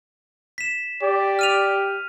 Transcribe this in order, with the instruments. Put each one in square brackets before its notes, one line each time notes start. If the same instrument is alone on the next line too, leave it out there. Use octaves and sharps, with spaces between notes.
[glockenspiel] B6 E7
[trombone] G4 [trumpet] D5
[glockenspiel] F6 D#7 F7